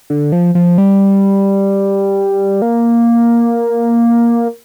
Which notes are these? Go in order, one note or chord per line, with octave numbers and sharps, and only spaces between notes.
D3
F3
F3
G3
A#3